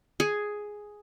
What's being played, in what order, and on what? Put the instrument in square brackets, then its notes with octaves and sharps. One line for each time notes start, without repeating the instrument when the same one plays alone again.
[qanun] G#4